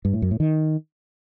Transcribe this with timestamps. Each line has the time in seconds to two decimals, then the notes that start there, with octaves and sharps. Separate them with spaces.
0.05 G2
0.13 A2
0.22 F#2
0.31 A2
0.40 D#3